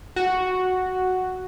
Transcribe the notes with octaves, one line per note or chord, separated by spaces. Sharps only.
F#4